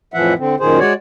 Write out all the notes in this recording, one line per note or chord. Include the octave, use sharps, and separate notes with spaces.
F2 A2 E3 F3 E5 F#5
D3 C4
F#2 A#2 D#3 G#4 C5
G#3 F#4 C#5 D5